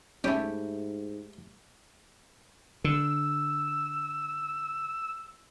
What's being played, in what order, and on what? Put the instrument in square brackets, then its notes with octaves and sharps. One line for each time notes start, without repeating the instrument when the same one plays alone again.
[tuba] G#2 [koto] A3 E4 G4 [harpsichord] C#4
[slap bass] D3 [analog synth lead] E6